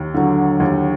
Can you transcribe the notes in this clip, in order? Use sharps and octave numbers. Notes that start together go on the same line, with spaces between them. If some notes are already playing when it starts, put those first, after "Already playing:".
Already playing: D#2
D3 F#3
D#2